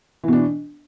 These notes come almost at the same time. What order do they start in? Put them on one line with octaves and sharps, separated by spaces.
E3 B2 D4